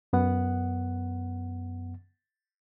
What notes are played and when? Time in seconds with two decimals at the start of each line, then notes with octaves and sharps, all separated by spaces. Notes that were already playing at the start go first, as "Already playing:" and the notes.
0.13 F#2 B3 F#5